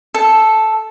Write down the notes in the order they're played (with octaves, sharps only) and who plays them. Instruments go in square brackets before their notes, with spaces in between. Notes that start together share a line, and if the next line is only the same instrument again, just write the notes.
[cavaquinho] A4